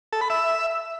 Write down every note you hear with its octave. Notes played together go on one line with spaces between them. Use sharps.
A4
B5
E5